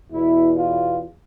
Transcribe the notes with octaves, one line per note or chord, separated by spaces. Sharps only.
E2 B2 E4
F4